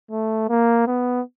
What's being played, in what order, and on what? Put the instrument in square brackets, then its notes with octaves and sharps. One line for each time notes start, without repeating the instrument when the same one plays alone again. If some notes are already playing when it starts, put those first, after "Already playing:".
[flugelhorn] A3
A#3
B3